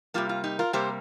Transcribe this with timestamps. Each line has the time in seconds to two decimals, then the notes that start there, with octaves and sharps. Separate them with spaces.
0.14 C3 G3 A#3 F4
0.29 F4
0.44 D#4 G4
0.59 F4 A#4
0.73 C3 G3 A#3 G4 C5